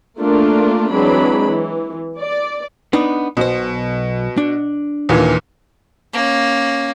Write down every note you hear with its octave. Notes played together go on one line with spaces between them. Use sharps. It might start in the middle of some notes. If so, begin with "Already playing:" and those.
A3 A#3 D4 F4 A#4
E3 F#3 G#3 C4 D4 B5
E3
D5
B3 D4 D#4
B1 B2 C5
D4
D#2 A#2 E3
A#3 C#4